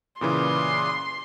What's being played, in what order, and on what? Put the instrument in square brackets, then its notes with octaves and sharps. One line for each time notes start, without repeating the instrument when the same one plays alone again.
[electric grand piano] A#2 C#3 E3 [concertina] B4 D5 D#6 [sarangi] C6